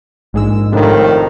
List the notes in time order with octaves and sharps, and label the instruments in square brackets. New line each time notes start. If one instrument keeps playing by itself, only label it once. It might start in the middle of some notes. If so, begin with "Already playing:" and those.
[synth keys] A#1 G#3 E6 [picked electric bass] G#2
[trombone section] F2 A2 D#3 [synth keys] C3 D4